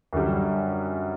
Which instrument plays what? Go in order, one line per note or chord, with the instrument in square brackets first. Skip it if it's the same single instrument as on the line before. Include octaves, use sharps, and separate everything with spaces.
[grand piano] F#2 D3 G3